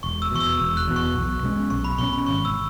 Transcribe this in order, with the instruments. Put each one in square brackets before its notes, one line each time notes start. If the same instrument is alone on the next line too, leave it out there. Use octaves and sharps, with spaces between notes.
[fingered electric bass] E1 [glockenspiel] C#6
[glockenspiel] E6
[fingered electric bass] E2 B2 [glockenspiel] C#6
[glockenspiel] E6
[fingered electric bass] E1
[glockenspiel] F#6
[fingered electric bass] E2 B2
[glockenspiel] C#6
[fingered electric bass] B1
B2 G#3 C#4
[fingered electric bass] B1 [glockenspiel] C#6
[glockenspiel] B5
[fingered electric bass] B2 G#3 C#4 [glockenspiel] C#6
[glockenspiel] B5
[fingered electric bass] G#1 [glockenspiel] C#6
[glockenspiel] E6